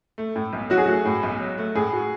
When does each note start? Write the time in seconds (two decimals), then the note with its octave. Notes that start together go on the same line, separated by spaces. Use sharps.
0.18 A3
0.36 A2
0.53 B1
0.70 F#3 F#4
0.78 G#4
0.86 A3 F#4
1.05 A2
1.23 B1
1.40 F#3
1.58 A3
1.75 A2 G#4
1.93 F#4